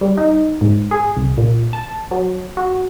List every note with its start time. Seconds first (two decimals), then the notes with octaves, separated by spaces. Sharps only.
0.01 G3
0.17 D#4
0.61 G#2
0.91 G#4
1.17 C2
1.37 A#2
1.73 A5
2.11 F#3
2.57 F#4